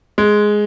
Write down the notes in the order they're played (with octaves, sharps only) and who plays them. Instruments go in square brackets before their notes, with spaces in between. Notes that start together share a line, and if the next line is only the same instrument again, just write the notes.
[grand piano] G#3